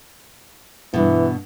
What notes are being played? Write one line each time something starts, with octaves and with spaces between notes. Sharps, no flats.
G2 B2 E3